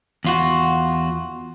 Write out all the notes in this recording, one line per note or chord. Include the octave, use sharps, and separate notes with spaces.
E2 F4 F#4